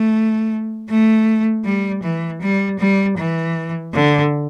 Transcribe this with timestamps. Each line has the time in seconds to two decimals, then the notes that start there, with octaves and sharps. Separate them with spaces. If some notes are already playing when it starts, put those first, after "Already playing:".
Already playing: A3
0.89 A3
1.65 G3
2.03 E3
2.41 G3
2.79 G3
3.18 E3
3.94 D3